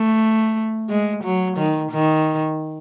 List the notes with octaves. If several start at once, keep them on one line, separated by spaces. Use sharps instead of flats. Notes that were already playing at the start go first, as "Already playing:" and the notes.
Already playing: A3
G#3
F#3
D#3
D#3